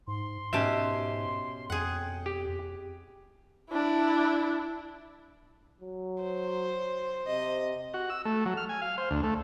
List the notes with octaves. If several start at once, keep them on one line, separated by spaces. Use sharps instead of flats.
G#2 C6
G#2 B2 C#4 G4 E5 A5
F2 G#4 F#5 G5
G4
D4 E4
F#3
C5
C3 D#5
F#4
E6
A3
F#3
F6
G#5
F5
C5
D2
A3